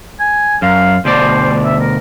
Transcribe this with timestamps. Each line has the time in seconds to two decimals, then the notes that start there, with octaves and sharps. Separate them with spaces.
0.20 G#5
0.62 F#2 F5
1.05 D2 B2 C5 D5
1.65 E5
1.81 A#4